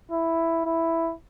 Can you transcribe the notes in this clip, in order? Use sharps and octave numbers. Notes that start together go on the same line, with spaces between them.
E4
E4